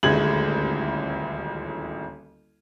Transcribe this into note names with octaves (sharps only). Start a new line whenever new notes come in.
D#1 A1 D2 G#3 G#6 F#7